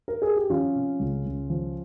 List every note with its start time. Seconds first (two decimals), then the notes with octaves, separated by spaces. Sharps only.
0.08 A#4
0.22 G#4
0.37 G4
0.50 F3 C#4 F4
0.75 C3
1.00 C#2
1.26 C#2
1.50 F3